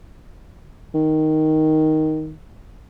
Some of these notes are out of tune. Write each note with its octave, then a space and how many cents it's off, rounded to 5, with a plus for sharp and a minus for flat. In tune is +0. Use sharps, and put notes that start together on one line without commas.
D#3 +5